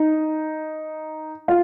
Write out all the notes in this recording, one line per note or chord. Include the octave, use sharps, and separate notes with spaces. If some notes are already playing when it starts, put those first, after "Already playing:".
Already playing: D#4
F4